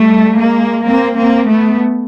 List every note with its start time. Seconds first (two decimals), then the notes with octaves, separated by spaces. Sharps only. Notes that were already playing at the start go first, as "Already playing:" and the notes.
Already playing: G3 A3
0.37 G#3 A#3
0.85 A#3 C4
1.16 A#3 C4
1.47 A3 B3